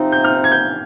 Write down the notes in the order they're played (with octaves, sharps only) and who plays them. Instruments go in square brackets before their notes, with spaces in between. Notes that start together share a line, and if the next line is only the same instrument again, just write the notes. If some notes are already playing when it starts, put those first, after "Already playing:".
Already playing: [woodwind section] C3 F3 C4 D#4
[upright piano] G6
F6
G#6
G6